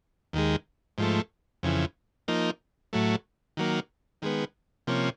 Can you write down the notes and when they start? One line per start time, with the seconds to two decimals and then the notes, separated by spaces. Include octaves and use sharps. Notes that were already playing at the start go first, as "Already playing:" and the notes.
0.33 D#2 D#3 G#3
0.98 G#2 F3 A3
1.63 F2 C#3 E3
2.28 F3 A#3 D#4
2.93 A2 F#3 A3
3.57 D#3 F#3 A#3
4.22 D#3 G#3 B3
4.87 C3 F3 A#3 C#4